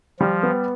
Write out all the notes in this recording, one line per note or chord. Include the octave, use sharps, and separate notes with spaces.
F3 G3
B3